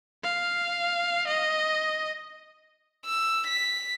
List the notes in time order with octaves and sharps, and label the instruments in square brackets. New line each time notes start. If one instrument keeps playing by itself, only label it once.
[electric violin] F5
D#5
[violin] E6
B6